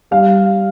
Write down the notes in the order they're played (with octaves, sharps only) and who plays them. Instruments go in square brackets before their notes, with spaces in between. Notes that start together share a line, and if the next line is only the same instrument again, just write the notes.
[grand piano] G3 F5